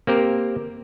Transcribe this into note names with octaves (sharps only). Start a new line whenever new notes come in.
A#3 C4 G4 A#4